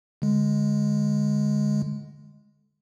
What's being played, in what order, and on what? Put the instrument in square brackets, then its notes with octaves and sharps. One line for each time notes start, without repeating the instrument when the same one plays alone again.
[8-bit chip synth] D3 G#3